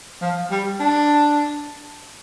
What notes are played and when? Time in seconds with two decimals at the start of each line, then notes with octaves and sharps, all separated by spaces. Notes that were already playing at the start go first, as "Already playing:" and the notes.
0.21 F3
0.51 G3
0.80 D4